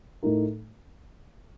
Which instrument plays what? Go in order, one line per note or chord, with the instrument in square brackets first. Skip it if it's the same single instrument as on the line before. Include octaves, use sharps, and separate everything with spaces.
[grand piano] A2 A3 D#4 A#4